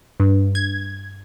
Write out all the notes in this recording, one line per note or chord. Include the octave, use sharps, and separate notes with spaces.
G2
G#6